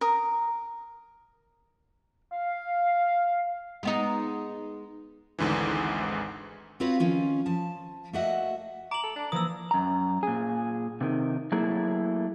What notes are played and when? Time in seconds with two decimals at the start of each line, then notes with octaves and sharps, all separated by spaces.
0.01 A#4 A#5 D#6
2.32 F5
3.83 G#3 B3 D#4
5.39 G#1 D2 G#2 D3 E3
6.80 C4 F4 F#4 B4 C#5 F5
7.00 D#3 F3 C#4 F4
7.46 F3 A5
8.13 A3 A#3 F#4 D#5 E5 F#5
8.91 A#5 D6 F#7
9.03 A4
9.16 D4
9.32 E3 F3 A#3 A#4 D#6 E6
9.71 F#2 A#5
10.23 A#2 G#4
11.01 C3 D#3
11.52 F#3 A3 A#3 E4 G#4